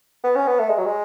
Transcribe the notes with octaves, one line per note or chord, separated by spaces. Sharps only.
B3
C#4
B3
A3
G#3
F#3
G#3